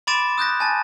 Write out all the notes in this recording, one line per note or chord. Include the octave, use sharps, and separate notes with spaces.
B5 C6 D6 A6 D7 E7
D#6 F#6 G6 A#6
G#5 A5 A6